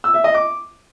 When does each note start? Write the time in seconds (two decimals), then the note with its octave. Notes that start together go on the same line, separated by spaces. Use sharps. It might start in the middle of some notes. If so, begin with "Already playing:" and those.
0.04 E6
0.14 E5
0.24 D#5
0.34 D6